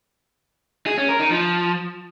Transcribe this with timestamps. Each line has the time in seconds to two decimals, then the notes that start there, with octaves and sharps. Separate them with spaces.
0.87 G#4
0.98 C#4
1.09 A#4
1.20 D#4
1.31 F3